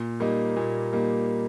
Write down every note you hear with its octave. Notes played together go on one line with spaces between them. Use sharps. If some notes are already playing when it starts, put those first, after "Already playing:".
Already playing: A#2
G3 A#3 D#4
A#2
G3 A#3 D#4